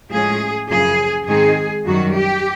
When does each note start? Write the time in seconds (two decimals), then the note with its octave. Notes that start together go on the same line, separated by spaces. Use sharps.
0.11 A2 F3 G#3 C#4 G#4
0.70 F#2 C#3 F3 G#4
1.27 G#2 D#3 G#3 C4 D#4 G#4
1.86 F#2 D#3 G3 F#4
2.15 G4